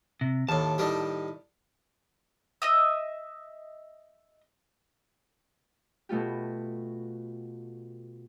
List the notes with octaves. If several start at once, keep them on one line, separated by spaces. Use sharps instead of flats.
C3
D#2 A2 A5
A2 D#3 G3
D#5 E5 D#6
B2 A3 F4 G4